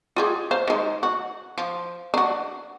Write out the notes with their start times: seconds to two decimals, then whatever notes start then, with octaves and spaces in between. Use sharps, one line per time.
0.16 F4 G4 G#4
0.51 C5 F5
0.68 D#3 G#3
1.03 F#4
1.58 F3
2.14 D4 F#4